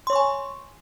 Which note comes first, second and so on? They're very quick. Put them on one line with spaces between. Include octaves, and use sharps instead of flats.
C6 C#5 C#6 G#5